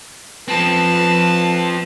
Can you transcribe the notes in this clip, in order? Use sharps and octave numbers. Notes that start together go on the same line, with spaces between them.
F3 C4 B4 A5